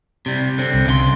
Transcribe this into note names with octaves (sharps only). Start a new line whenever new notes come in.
C3 G3
D3 C4
C2
C#3 D5 C6